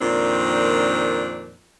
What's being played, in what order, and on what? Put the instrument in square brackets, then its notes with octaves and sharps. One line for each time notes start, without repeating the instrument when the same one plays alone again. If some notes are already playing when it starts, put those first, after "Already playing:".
[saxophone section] F2 A#2 D#3 C4 D4